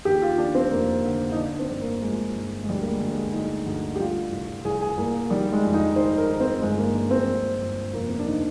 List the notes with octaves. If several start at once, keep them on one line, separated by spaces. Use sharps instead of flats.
D#2 G4
F4
D#2 D4
C4
F1 A#3
D3
D#4
D3 D4
C4
G1
A#3
F3 G#3
G1
G#3
D2 G3
A#3
G#3
D2
G#3
D2 D#4
D2
G4
G3 F4
C2
C2 G#4
G#4
C2 A#3
D#3 G3
G#3
F2
D#4
D#3 C5
A#4
D#3
C4
G1 G#3
A#3
G2 D4
C4
G1
G1
F1 A#3
C4
D4
D#3 D#4